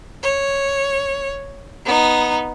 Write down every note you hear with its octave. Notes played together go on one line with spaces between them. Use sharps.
C#5
B3 D#4